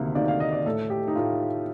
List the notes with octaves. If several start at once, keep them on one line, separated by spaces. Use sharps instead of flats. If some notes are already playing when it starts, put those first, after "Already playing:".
Already playing: D2 C3 D#3 A#3
D2 C3 D#3 A#3 D5
F5
D#5
D5
A2 A3 A4
G4
D#4
A2 A3 F4